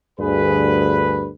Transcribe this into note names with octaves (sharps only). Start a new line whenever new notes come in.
D2 G2 G#4 B4